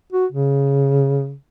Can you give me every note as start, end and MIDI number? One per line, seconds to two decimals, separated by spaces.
0.13 0.26 66
0.32 1.34 49